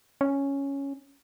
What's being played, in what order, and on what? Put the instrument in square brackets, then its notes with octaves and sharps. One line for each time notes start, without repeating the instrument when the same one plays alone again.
[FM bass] C#4